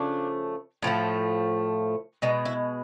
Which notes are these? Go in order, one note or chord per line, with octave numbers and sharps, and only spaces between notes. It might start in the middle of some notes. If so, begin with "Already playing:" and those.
Already playing: C#3 F3 A3 D4
A2 F3 A3
B2 G#3 D#4
E4